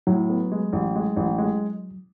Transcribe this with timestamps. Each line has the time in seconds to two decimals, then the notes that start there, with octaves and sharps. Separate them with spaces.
0.07 A2 F#3
0.29 B3
0.52 G#3
0.73 A1
0.96 G#3
1.16 A1
1.38 G#3